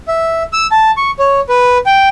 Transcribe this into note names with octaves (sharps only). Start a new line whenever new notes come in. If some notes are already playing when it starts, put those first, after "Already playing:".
E5
E6
A5
C#6
C#5
B4
G5